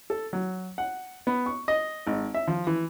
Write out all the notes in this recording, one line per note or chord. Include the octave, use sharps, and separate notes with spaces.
A4
F#3
F#5
B3
C#6
D#5
G#1
E5
F3
E3